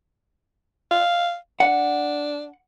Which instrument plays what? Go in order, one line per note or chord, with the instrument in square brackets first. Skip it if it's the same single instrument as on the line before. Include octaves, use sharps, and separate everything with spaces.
[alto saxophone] F5
[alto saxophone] D4 [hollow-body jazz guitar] F#5